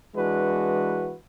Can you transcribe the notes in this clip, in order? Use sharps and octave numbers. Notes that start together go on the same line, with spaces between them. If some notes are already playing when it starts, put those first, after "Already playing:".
E3 G#3 D4 F#4 B4